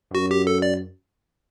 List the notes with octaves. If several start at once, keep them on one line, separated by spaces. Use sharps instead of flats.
F#2 F#4
G4
A4
D5